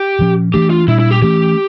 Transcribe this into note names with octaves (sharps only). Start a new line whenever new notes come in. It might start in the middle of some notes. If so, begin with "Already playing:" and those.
Already playing: G4
A#2 F3 C#4
E3 A3 D4 G4
F4
A#2 G3 D4 E4
E4
G4
E3 A3 C#4 G4